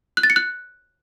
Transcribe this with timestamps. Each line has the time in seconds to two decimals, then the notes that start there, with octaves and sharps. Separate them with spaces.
0.17 F#6
0.23 A6
0.30 C#7
0.36 F#6